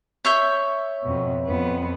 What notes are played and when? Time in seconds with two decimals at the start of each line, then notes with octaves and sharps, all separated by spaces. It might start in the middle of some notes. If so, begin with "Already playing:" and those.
0.25 C#5 E5 G6
1.04 F2 B2
1.46 F2 B3